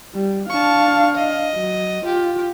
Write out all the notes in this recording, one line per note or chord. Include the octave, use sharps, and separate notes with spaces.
G3
D4 F5 A5 C#6
D#5
F#3
F4 G4